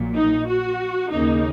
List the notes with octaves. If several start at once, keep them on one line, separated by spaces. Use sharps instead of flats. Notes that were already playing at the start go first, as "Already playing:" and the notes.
Already playing: A#1 A#2 F#3
D#4
F#4
D#2 C#3 A#3 D#4